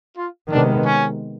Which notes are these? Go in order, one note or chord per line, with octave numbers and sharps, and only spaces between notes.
F4
C3 D#3 G#3 B3 D4
C#4